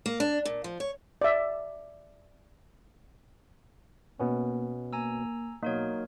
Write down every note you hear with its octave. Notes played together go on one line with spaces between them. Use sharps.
A#3
D4
A#2
F3
C#5
D5 E5
B2 A#3 B3 C#4
A#3 G#5 A#5 E6
B2 F#3 A#3 D#4 A#4 C#5